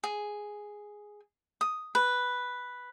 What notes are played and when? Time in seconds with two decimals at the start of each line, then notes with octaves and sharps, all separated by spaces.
0.04 G#4
1.61 D#6
1.95 B4